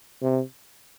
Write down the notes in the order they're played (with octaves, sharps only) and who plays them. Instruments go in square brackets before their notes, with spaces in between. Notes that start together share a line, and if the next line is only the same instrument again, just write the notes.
[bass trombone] C3